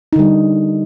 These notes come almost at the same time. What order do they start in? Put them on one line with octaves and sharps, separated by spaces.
D#4 D3 G3